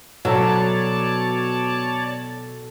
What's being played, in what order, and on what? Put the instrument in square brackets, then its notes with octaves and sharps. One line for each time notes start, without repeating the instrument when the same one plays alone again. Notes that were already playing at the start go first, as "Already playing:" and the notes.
[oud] B2 [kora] F#3 [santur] A4 [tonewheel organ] C#5 D5 A5